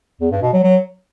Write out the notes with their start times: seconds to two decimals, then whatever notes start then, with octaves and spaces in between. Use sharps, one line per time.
0.21 E2
0.31 G2
0.42 B2
0.53 F#3
0.63 F#3